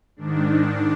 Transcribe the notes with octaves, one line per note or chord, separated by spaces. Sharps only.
G#2 D#3 D4